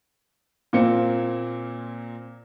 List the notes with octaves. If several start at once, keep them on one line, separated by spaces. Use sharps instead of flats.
A#2 A#3 C4 C#7